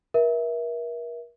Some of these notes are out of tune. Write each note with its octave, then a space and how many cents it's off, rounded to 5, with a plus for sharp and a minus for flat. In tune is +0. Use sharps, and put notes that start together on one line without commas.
A#4 +35 E5 -5